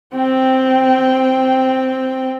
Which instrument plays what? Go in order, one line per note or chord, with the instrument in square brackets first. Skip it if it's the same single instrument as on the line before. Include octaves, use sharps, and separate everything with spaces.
[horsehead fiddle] C4 G5